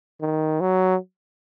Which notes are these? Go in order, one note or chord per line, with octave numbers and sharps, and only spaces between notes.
D#3
F#3